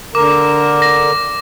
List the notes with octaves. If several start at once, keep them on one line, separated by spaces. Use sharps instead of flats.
D3 A#4 D6
A#6